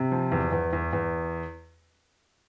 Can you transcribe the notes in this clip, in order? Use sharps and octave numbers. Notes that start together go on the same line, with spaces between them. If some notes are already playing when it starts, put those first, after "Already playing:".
Already playing: C3
F3
E2
E2
E2
E2